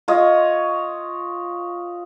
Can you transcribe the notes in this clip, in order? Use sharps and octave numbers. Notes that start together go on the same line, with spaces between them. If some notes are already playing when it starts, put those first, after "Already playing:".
F4 C#5 D#5